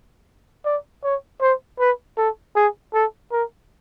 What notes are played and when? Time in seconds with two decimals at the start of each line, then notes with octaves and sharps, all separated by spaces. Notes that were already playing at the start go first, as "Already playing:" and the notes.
0.65 D5
1.04 C#5
1.41 C5
1.80 B4
2.18 A4
2.56 G#4
2.94 A4
3.32 A#4